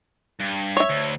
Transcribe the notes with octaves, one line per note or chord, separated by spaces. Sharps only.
G2
C#5 E5
D2